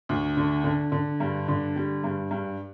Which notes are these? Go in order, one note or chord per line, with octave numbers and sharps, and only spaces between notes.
D2
D3
D3
D3
G2
D3
G3
G2
G2